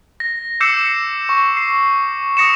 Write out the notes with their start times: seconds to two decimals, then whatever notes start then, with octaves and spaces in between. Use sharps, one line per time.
0.20 A#6
0.60 D6 E6 G6 C7 C#7 E7
1.29 C#6
1.57 C7
2.37 D#6 A#6 C#7 E7